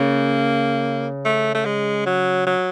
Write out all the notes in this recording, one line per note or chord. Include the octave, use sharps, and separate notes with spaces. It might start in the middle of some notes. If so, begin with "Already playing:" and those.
Already playing: C#3 A#3
A3
A3
G#3
F#3
F#3